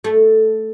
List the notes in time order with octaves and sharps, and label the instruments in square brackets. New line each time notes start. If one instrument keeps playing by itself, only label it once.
[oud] A3